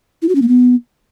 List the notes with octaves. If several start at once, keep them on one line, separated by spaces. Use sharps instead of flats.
E4
F#4
C#4
A#3
B3